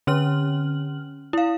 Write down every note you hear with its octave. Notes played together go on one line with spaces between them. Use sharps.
D3 C#4 F6 F#7
E4 F5